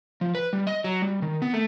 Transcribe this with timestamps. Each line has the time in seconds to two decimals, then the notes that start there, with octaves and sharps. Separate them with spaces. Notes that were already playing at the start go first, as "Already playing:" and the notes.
0.21 F3
0.35 B4
0.53 G3
0.67 D#5
0.84 F#3
1.02 G3
1.22 D#3
1.42 B3
1.53 A3